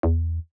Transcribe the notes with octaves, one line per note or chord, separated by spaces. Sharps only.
E2